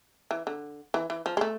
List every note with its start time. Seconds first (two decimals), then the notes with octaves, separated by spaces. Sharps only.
0.31 E3
0.47 D3
0.94 E3
1.10 E3
1.26 F3
1.37 G#3
1.41 A3